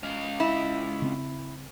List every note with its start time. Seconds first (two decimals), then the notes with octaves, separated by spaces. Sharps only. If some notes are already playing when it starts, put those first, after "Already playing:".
0.03 C#2 F5
0.40 E4
1.02 C#3 C4